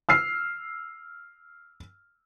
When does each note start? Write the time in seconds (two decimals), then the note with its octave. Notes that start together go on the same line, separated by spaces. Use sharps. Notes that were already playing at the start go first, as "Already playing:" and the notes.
0.09 E6 F6 C7